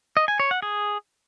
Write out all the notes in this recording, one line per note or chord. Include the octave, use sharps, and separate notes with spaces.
D#5
G#5
C#5
F#5
G#4